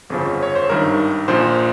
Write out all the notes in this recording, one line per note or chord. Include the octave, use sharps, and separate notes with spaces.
G1 F2 C#3 F3
C#5
C5
G#1 G2 D#3 A#4
A#1 A#2 F3 C5